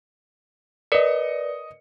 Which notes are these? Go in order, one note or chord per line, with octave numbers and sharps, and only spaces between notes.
A#4 B4 D5 D#5 C#7